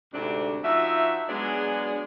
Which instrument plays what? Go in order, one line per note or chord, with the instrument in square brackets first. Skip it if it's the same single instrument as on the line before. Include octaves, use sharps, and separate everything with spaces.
[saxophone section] D2 G#2 C3 D4
F3 D#4 F#4 E5
F#3 G#3 B3 D4 G#4 D5